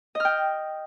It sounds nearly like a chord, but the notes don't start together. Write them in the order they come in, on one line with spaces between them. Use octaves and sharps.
D#5 F6 G5